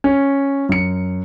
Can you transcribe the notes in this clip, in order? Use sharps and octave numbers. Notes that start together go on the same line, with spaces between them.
C#4
F#2 C#7